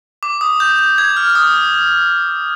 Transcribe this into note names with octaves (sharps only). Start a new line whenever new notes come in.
D6
D#6
G6
G6
G#6
F6
F6
D#6